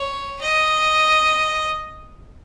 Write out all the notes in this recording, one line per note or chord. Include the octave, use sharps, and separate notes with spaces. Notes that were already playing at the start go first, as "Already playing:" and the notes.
Already playing: C#5
D#5